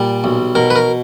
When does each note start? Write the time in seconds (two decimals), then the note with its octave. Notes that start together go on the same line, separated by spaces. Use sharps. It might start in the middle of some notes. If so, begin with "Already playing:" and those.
Already playing: A#2 G3
0.24 B1
0.55 B2 A#4
0.70 B4
0.76 A#4